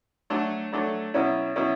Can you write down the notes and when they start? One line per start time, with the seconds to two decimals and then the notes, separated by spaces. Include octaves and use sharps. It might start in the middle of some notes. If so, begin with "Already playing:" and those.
0.30 F#3 A3 D4 A4 C#5
0.73 F#3 A3 D4 A4 C#5
1.14 B2 F#3 C#4 E4
1.56 B2 F#3 C#4 E4